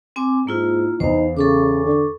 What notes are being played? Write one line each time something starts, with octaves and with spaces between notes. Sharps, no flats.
C4 G#5 D6
G#2 A#3 E4 F4
E2 D#4 C5 F5
C#3 A4 C#6 D6
D3